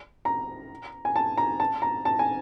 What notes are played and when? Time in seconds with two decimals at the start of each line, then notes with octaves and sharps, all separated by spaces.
0.25 A#5
1.05 G#5
1.16 A5
1.38 A#5
1.60 A5
1.82 A#5
2.05 A5
2.19 G#5